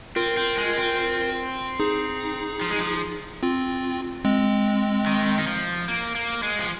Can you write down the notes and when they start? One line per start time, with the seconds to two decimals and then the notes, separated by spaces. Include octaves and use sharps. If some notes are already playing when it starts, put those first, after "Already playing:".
0.16 C4 F4 A#4
0.37 C4
0.57 G#3
0.77 C4
1.80 D#4 G#4
2.61 F3
2.70 G#3
2.79 F3
3.43 C4 F4
4.25 G#3 C4
5.06 D#3
5.38 D#3
5.47 F3
5.88 A#3
6.15 A#3
6.43 G#3
6.59 F3